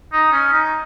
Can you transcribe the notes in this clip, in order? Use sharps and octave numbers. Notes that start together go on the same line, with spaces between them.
D#4
C#4
D#4